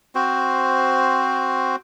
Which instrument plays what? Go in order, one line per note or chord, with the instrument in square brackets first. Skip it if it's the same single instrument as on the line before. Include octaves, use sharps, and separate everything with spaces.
[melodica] C4 F#4 C5